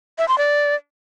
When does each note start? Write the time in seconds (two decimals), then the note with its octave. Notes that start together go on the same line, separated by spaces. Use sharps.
0.18 E5
0.28 C6
0.38 D5